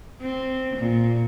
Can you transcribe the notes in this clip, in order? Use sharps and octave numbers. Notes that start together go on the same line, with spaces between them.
C4
A#2